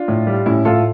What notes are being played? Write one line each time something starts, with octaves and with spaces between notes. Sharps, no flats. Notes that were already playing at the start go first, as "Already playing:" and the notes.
Already playing: D4 F4
A2
G3
A2 C#4 E4
A2 F4 A4